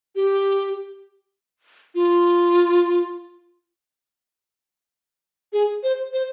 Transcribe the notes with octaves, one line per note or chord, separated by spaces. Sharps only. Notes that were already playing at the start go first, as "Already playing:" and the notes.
G4
F4
G#4
C5
C5